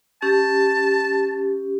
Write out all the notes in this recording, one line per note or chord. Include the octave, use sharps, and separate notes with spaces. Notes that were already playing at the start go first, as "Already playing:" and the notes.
C#4 G4 A5